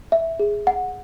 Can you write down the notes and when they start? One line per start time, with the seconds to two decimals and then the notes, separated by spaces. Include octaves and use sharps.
0.12 E5
0.40 G#4
0.67 F#5